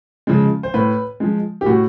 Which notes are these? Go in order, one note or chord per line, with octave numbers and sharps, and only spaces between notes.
C#3 F3 G#3
C5
A2 B4
F3 G#3
G4
A2 F#4